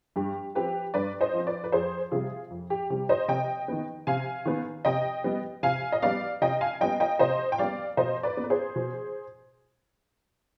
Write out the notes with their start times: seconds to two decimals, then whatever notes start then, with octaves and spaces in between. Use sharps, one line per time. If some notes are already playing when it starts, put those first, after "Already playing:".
0.16 G2 G4
0.55 F3 C4 G4 B4
0.94 G2 B4 D5
1.21 C5 D#5
1.33 F3 C4
1.47 B4 D5
1.64 B4
1.72 F2 G#4 C5
2.11 C3 G3 F4 G#4
2.50 F2
2.70 G4
2.90 C3 G3 G4
3.09 C5 D#5
3.28 C3 D#5 G5
3.68 D#3 B3
4.07 C3 F5 G#5
4.46 D#3 B3
4.85 C3 D#5 G5
5.24 G3 B3
5.63 C3 F5 G#5
5.92 D#5
6.02 G3 B3 D5 F5
6.41 C3 D#5 G5
6.61 F5 G#5
6.81 G3 B3 D#5 G5
7.00 D#5 G5
7.19 C3 C5 D#5
7.52 G5
7.58 G3 B3 D5 F5
7.97 B2 C5 D#5
8.23 B4 D5
8.37 B3
8.44 B4
8.50 G#4 C5
8.76 B2